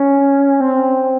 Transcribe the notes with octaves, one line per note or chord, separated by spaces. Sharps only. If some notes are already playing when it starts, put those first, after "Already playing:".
Already playing: C#4
C4